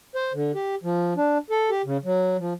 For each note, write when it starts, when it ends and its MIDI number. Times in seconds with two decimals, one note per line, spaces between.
0.15 0.32 72
0.34 0.52 50
0.55 0.75 67
0.83 1.14 53
1.17 1.38 62
1.50 1.70 69
1.70 1.82 67
1.85 1.97 49
2.04 2.37 54
2.39 2.53 53